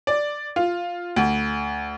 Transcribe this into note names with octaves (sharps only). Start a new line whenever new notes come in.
D5
F4
D2